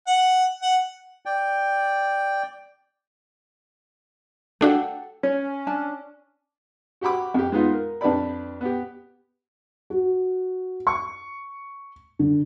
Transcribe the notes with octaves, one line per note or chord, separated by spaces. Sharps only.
F#5
F#5
D5 G5
A3 D4 F#4 G4 A4 F#5
C#4 C#5
D4 A5
F#4 G4 F#5 B5 D6
F2 G4
G#3 B3 D#4 F4
A#4
F2 D4 G4 B4 D5 B5
B3 G4
F#4
C#6
D3